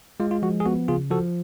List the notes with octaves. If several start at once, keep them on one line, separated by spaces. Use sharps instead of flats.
G#3 F4
F4
F3 F#4
G#4
B3 F#4
C#3 F4 G#4
F3 F#4 A4